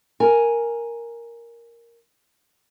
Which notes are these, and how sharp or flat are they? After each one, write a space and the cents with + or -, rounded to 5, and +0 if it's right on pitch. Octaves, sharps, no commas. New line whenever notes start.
A#4 +0 G#5 +0